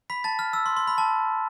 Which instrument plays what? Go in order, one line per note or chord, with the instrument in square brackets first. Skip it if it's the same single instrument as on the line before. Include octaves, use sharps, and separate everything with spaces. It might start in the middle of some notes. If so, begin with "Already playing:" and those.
[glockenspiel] B5 B6
A5 A6
F6
E6
C6
C6
B5
A5